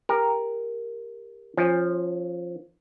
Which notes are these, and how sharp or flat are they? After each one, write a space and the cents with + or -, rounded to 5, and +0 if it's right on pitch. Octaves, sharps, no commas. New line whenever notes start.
G4 +20 A#4 +0
F3 +0 C#4 -20